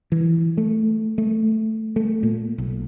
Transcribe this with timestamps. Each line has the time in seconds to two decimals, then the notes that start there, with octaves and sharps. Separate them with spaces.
0.12 E3
0.57 A3
1.18 A3
1.96 A3
2.23 A#2
2.58 B1